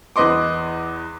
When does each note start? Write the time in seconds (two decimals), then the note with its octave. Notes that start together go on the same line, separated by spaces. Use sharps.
0.16 E2 B4 D#5 C6 D6